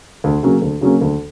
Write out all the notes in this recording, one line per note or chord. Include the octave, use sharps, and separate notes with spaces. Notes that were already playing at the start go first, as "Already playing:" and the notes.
D2
C#3 F#3 A#3 C#4
D2
C#3 F#3 A#3 C#4
D2